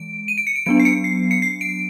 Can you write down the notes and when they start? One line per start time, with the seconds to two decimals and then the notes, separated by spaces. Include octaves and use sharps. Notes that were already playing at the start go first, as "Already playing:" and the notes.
Already playing: E3 G#3 D7
0.28 D#7
0.38 D7
0.47 C#7
0.56 D7
0.66 F#3 B3 D4 D7
0.80 C7
0.85 C#7
1.04 C7
1.31 C#7
1.42 C7
1.61 D7